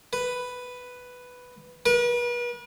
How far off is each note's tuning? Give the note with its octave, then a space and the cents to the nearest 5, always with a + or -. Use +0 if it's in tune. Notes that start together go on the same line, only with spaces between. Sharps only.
B4 +5
B4 -40